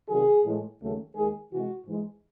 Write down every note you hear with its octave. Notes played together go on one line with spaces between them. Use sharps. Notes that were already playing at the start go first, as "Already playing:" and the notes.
C3 D#3 F#3 G#4
A2 E3 G#3
D#2 C#3 F#3 A3
D#2 D#3 G#3 G#4
C3 E3 G#3 F#4
G#2 E3 G#3